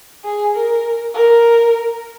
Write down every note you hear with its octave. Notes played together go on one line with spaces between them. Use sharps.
G#4
A#4
A#4